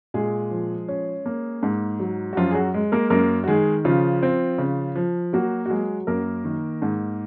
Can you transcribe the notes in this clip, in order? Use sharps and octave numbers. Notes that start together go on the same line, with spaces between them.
A#2 G#3 G#4
F3
C#4
A#3
G#2
F#3
F#4
F#2 F3 F4
G#4
F#3 F#4
G#3
A#3 A#4
F#2 A#3 A#4
F#4
D#3 G#3 G#4
C#3 F3 F4
C4
C#3
F3
F#3 A#3 F#4
F#4
F#3 G#3 G#4
F#2 A#3 A#4
D#3
G#2